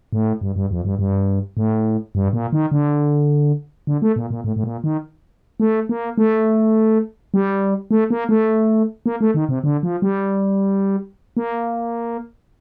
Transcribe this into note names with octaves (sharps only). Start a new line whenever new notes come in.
A2
G2
G2
F2
G2
G2
A2
G2
A#2
D#3
D3
D3
A3
A#2
A#2
A2
A2
A#2
D#3
A3
A#3
A3
G3
A3
A#3
A3
A#3
A3
D#3
C3
D3
F3
G3
A#3